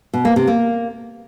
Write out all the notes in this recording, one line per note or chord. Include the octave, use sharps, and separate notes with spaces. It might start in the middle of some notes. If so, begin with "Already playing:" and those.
B2
A#3
C3
A#3